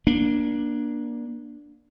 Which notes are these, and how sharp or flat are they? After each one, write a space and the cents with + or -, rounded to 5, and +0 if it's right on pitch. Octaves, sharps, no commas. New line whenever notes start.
A#3 +30 D4 +0